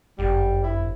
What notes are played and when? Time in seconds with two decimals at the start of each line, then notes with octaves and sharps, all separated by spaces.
0.19 G1 F#2 G3
0.64 E4